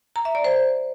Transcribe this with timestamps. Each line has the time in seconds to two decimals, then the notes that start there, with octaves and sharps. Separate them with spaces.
0.16 A#5
0.25 E5
0.35 D5
0.44 C5